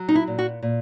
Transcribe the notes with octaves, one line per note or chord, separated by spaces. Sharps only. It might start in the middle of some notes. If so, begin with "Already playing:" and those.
Already playing: F#3
D#4
E4
A#2
F#4
A#2